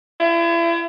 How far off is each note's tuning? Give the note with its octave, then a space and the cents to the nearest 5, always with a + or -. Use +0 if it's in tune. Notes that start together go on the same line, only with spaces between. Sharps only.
E4 +40